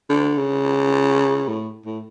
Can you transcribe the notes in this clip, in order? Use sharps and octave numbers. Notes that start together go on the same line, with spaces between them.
D3
C#3
A2
A2